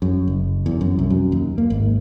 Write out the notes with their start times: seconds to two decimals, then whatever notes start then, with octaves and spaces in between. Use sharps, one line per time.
0.02 F#2
0.28 F#1
0.66 E2
0.81 F#2
0.99 C2
1.10 F#2
1.32 D#2
1.58 A#3
1.70 G#1